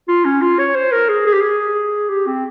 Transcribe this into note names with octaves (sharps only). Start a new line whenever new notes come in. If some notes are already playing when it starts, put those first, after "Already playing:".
F4
C#4
F4
C#5
C5
A#4
G#4
G#4
G4
G#4
G4
C4